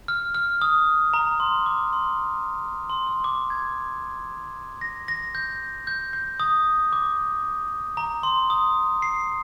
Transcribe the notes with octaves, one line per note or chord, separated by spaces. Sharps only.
F6
F6
D#6
A#5
C6
D6
C6
C6
C6
D6
G#6
A#6
A#6
G6
G6
G6
D#6
D6
A#5
C6
D#6
C7